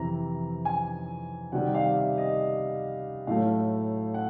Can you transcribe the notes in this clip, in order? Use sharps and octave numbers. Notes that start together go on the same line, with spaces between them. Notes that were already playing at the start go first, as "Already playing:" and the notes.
Already playing: F2 C3 E3 A#5
G#5
C3 D#3 G3 F#5
F5
E5
D#5
A2 F#3 A3 F5
F#5